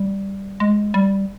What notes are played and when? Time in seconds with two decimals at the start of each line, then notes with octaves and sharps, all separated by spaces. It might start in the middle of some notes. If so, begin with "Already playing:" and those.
Already playing: G3
0.60 G#3
0.94 G3